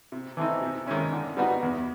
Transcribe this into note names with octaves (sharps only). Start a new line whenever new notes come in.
C3
E3 A3 C4 D#4
C3
D#3 G#3 C#4 E4
D3
G3 B3 D#4 F#4
E2